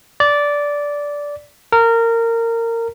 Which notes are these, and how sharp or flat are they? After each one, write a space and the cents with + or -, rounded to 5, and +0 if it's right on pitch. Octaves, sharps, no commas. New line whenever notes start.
D5 -15
A#4 -20